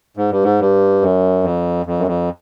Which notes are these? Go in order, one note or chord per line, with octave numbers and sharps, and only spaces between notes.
G#2
G2
G#2
G2
F#2
F2
F2
F#2
F2